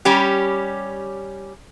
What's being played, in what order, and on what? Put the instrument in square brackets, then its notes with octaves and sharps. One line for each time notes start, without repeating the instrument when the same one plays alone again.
[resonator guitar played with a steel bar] G3 C#4 G4